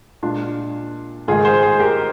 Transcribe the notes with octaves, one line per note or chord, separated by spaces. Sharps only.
A#2 G#3 D4 F4
G#2 D#3 G#3 F4 G#4
G#4 C5
G#4 C5
G4 A#4